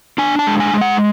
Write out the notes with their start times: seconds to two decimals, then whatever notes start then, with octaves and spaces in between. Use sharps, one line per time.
0.18 D4 G#5
0.39 A5
0.47 G#3
0.60 G#5
0.74 G#3
0.81 F#5